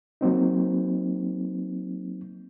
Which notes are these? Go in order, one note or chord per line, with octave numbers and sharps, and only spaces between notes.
F#3 A#3 C4 D#4